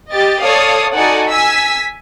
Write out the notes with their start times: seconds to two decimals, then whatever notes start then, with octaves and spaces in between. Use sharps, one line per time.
0.10 G4 D#5 A6
0.41 A4 C#5 D5 F5 D#6
0.96 D#4 F#4 A4 D5 F#5 G#5
1.29 G#5 E6 B6